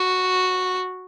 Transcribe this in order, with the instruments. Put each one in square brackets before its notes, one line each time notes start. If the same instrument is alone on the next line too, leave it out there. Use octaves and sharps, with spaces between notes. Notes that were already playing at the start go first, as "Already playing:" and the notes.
Already playing: [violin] F#4